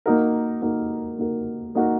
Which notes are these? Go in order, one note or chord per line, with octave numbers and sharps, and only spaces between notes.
A#3 D#4 F#4 A#4
A#3 D#4 F#4 A#4
A#3 D#4 F#4 A#4
A#3 D#4 F#4 A#4